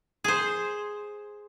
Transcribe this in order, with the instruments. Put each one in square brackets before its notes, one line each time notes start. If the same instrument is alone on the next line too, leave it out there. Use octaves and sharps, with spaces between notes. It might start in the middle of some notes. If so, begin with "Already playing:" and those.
[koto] G#4 C5